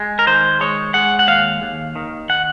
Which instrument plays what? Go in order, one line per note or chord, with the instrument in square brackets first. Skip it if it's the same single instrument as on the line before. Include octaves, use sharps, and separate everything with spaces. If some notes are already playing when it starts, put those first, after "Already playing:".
Already playing: [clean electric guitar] G#3
A#4
D#3 C5
G#3 C#5
G#3 F#5
F#5
D#2 F5
D#2
D#3
F#5